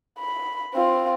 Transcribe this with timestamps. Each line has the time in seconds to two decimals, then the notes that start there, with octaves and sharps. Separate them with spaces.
0.19 B5
0.75 C4 F4